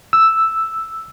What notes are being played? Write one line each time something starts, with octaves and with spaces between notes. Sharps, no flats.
E6